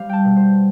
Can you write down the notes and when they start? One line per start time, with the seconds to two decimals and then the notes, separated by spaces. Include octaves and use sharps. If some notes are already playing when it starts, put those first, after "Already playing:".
Already playing: G3 C5 F5
0.09 G5 A5
0.25 B2
0.37 C5